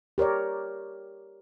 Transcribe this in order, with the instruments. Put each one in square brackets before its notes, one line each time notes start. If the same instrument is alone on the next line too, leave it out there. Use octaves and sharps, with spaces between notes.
[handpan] G4 A#4 C#5 D5